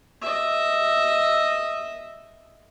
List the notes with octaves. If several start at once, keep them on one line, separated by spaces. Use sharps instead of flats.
D#5 E5